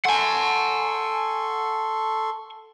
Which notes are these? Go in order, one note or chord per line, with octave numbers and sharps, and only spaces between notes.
A4 F#5 G#5 C6 C#6